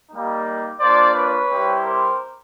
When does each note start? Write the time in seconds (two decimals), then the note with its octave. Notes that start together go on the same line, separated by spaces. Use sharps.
0.11 G3 A#3 D#4
0.80 A#3 D4 F4 C5 D5
1.15 B4 C#5
1.50 G3 C4 E4 G4
1.84 A#4 C5